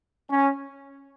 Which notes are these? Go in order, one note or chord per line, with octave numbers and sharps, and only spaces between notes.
C#4